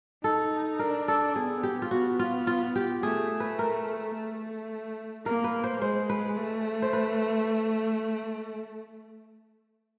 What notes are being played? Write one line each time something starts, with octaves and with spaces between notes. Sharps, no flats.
D#4 A4
D4 A#4
A4
B3 G#4
G4
F4
B3 F#4
F4
F4
G4
A3 G#4
B4
A#4
A3
A#3 A#4
B4
C5
G#3 C5
B4
A3
C5
B4